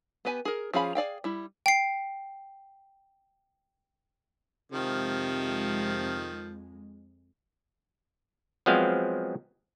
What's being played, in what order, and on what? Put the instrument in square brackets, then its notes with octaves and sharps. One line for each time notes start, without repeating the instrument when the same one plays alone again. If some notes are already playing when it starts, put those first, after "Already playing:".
[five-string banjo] B3 G4 B4 G#5
G#4 A#4
F3 C#4 G#4 F5 B5
G#4 D5 F5 G5
G3 E4
[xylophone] G5 C7
[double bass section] F2 G#3 [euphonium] C3 [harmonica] D#3 F3
[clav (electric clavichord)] F3 F#3 G#3 B3 C4 F5